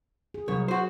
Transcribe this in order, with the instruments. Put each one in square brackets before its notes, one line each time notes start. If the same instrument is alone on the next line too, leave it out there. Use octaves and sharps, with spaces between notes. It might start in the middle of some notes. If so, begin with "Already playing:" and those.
[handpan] G#4
[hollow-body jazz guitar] C2 C#5 [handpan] F#3 D4 A#4
[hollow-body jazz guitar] F#4 C5